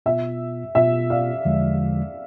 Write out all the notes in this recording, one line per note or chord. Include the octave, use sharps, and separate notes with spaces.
B2 B3 F4 E5
B2 B3 F4 E5
D5 F5
E2 D3 F3 G#3